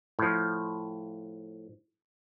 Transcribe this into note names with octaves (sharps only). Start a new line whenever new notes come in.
A2 F3